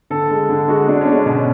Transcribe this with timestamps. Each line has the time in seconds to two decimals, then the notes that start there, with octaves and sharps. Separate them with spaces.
0.10 D3 A4
0.30 G#3
0.49 D3
0.68 G#3 F#4
0.88 D3 D4
1.01 C#4
1.07 G#3 D4
1.26 B2 C#4